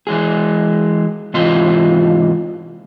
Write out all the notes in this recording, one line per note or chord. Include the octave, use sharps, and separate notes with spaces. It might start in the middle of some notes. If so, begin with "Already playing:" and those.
E3 G#3 G#4
G#2 C3 E3 F4 D#5 C6